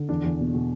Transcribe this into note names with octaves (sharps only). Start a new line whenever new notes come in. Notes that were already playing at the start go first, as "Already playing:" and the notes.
Already playing: D3
E2 D4
E2
B2
B2